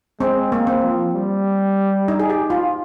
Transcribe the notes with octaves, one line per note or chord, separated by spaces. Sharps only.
G#3 C4
A#3
C4
F3
G3
D#4
G#4
G4
F4